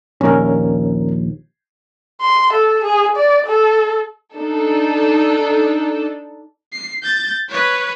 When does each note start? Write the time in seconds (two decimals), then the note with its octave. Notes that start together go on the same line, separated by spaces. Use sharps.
0.21 A#1 D#2 C#4 A#4
2.21 C6
2.53 A4
2.84 G#4
3.16 D5
3.47 A4
4.35 D4 D#4 A4
6.72 C7
7.03 G6 A6
7.49 B4 C#5